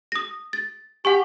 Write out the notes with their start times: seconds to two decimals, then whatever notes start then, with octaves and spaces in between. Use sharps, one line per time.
0.12 D#6 A#6
0.53 A6
1.05 G4 F#5 G#5 C#6